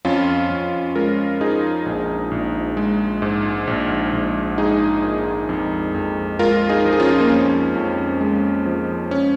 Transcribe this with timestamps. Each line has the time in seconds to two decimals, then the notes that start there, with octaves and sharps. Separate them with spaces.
0.05 F2 C#4 F4
0.50 F2
0.95 G#3 F4 A#4
1.41 F3 D#4 G#4
1.86 A#1
2.31 A#1
2.77 G#3
3.22 G#2
3.67 A#1
4.13 A#1
4.58 G#3 D#4 G#4
5.04 A#2
5.49 F2
5.94 F2
6.39 G#3 F4 A#4
6.69 D#4 G#4
6.85 F3
6.93 G#4
7.00 C#4 F4
7.20 A#3
7.30 F2 C#4
7.75 F2
8.21 G#3
8.66 F3
9.11 C#4